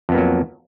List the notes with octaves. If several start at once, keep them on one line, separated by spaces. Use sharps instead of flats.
F2 F#3 A#3 B3